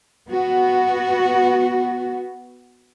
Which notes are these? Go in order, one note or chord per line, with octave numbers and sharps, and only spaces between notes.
B3 F#4